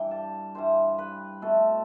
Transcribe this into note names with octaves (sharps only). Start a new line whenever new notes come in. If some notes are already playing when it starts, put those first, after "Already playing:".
Already playing: G2 E3 G3 G5
A5
G2 E3 G3 C5
B4
B2 A3 C4 A4